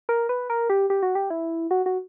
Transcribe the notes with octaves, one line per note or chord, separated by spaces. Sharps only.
A#4
B4
A#4
G4
G4
F#4
G4
E4
F#4
F#4